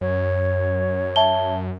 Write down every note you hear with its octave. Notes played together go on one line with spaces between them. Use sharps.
F#2 C#5
E5 A5 G7